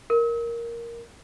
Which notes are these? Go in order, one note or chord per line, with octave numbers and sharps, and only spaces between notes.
A#4